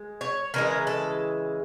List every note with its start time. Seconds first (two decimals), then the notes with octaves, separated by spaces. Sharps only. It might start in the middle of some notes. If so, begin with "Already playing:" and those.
Already playing: G#3
0.21 C#5
0.54 C#3 E3 G#3 A#4
0.87 A4